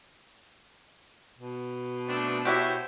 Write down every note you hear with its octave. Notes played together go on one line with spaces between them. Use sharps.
B2
A3 C4 D4
E4 F#4 G4 C5 C#5 E5